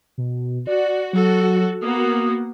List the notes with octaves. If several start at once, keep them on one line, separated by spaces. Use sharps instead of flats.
B2
F#4 D5
F#3 F#4 A4
A#3 B3 F#4 D#6